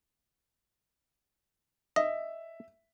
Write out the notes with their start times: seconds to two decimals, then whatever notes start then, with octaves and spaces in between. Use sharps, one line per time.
1.96 D#5 E5